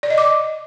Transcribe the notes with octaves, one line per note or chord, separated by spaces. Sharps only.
D5
D#5
D6